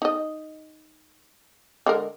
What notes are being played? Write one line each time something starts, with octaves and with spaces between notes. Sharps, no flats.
D#4 D#5
D3 G#3 A#4